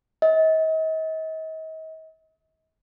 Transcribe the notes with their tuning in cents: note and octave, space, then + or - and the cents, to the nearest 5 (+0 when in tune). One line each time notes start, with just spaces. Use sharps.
D#5 +40